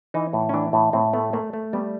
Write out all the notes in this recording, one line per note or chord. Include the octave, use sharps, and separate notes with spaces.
E3 D#4
A2
C#4
E3 D4
A2
A2 C4
A3 B3
A3 A#3
A3
G3 B3